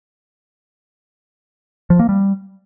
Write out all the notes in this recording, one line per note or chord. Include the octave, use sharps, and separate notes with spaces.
F3
A#3
G3